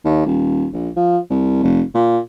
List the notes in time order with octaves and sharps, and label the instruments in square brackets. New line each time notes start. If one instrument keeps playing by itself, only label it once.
[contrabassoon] D#2
D#1
A#1
F3
C2
F1
A#2